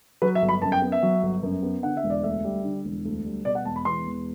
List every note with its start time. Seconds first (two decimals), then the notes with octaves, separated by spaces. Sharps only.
0.22 F#3 B4
0.35 E5
0.42 G1
0.49 B5
0.62 F#2 A5
0.72 G5
0.82 B3
0.92 E5
1.02 F#3
1.23 G1
1.43 F#2
1.63 B3
1.83 D3 F#5
1.97 E5
2.03 E1
2.10 D5
2.23 D2 E5
2.44 G3
2.64 D3
2.85 E1
3.05 D2
3.25 G3
3.45 B2 D5
3.55 F#5
3.65 E1 A5
3.76 B5
3.85 E2 C6
4.06 E1